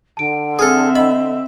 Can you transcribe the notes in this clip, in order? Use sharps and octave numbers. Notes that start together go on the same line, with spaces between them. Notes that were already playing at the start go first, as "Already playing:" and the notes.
D3 A5 D7
C4 G#4 A4 E5 D#6 F6
D#5 B5